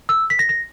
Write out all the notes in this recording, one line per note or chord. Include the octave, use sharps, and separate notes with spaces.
E6
B6
A#6
A#6